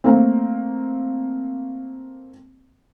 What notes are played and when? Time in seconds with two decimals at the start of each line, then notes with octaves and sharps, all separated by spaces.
0.04 A3 A#3 C4